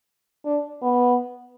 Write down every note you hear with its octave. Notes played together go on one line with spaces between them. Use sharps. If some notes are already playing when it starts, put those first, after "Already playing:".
D4
B3